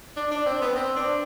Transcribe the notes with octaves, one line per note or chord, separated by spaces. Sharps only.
D4
D4
C4
B3
C4
D4